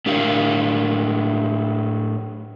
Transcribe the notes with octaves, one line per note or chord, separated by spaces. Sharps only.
A2 D4 G4 A#4 F5